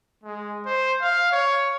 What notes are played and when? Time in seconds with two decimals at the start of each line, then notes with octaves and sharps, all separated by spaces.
0.23 G#3
0.66 C5
1.01 F5
1.32 C#5